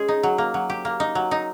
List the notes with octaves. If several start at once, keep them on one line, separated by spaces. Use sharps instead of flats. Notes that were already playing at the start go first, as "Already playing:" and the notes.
Already playing: G#3 C#4 G#4
D#4
F#3
A#3
F#3
G4
A#3
D#4
F#3
D#4